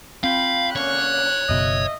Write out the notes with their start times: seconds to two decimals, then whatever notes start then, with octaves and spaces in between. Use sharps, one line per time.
0.24 C4 F4 F5 G5 B5
0.76 D3 A#3 C#4 C#5 F#6
1.49 F#1 B2 D#5 E5